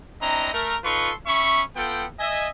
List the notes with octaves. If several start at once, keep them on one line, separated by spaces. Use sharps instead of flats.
C4 D4 E4 D#5 A#5
A3 A#4 A#5
D#4 F4 A4 B4 C6 C#6
C#4 E5 B5 C#6
B3 F4 A4 G5
D#5 E5 G#5